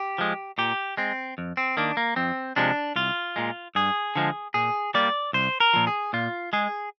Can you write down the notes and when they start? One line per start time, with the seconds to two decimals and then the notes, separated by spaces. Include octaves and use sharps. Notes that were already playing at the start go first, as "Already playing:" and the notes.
Already playing: G4
0.18 F3 G#3
0.58 A#2 G4
0.97 G#3 C4
1.38 F2
1.57 C4
1.77 D#3 A#3 D4
1.97 A#3
2.16 F2 C4
2.56 C3 F3 G#3 D4
2.96 C2 F4
3.36 A#2 G#3
3.75 G2 G#4
4.16 D3 F3 G#3
4.54 A#2 G#4
4.94 G3 A#3 D5
5.33 C2 C5
5.60 A#4
5.73 A#2 F3
5.87 G#4
6.13 A#2 F4
6.53 G#3 G#4